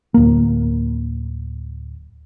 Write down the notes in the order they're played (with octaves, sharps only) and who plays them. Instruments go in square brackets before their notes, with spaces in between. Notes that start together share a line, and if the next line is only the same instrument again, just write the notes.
[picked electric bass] D1 A#3